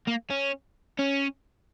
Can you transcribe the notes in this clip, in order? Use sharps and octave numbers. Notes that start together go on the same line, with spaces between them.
A#3
C#4
C#4